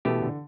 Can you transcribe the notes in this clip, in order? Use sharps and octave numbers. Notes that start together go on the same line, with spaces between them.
B2 E3 A3 G4
D3